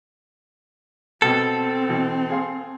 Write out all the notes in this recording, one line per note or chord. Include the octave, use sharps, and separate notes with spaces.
B2 B3 C4 A4 G5
B2 E3
G#4 F5 C6